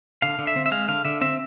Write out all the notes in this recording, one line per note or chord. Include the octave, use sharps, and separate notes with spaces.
D3 F5
D3
E5
C4
E5
G#3 F5
D3 F5
D3 E5
C4 E5